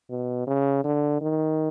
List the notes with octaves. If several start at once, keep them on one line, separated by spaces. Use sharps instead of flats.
B2
C#3
D3
D#3